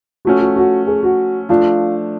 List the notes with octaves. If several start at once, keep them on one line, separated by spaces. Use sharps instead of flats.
F3 A3 C#4 F#4
F#4
F#4
G#4
F#4
F3 A3 D4 F4